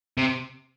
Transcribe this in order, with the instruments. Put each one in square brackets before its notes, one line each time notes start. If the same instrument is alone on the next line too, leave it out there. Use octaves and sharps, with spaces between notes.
[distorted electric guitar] C3